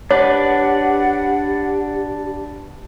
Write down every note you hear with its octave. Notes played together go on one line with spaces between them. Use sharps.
D4 G4 B4 C#5 D5 F#5